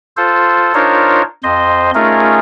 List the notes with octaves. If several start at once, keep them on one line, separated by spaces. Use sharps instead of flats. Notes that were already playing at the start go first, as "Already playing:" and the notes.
F4 A4 C5
D4 D#4 F4 A#4 C5 C#5
F2 C5 D#5 C6
A3 C#4 D#4 F4 G#4 A#4